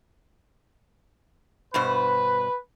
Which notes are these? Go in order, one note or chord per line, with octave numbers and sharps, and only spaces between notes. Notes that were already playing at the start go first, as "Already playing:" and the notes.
G2 B2 B4 C5